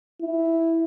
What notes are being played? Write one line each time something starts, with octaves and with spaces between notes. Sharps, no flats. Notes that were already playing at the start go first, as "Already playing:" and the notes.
E4